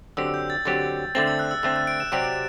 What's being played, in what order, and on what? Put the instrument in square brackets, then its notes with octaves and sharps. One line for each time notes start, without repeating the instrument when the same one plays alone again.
[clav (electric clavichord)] D3 F#3 C4 G4 [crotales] E6
[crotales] G6
A6
[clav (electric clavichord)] D3 F#3 C4 G4 [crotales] A6
[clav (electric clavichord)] D3 A3 C4 [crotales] A6
[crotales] E6
F#6
E6
[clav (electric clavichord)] D3 A3 C4 [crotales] E6
[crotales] F#6
D7
E7
[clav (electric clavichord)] C3 F#3 C4 G4 D5 [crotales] D7